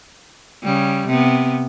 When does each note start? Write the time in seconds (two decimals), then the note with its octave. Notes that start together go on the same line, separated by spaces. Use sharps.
0.63 C#3 G3
1.07 C3 B3